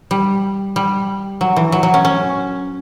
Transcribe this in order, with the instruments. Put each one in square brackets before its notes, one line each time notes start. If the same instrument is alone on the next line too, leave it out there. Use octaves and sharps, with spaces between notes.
[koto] G3
G3
F#3
E3
F#3
F#3
C#4
C#4